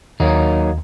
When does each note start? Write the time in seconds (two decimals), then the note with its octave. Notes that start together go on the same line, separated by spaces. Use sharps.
0.20 D#2 F#3 A#3 D#4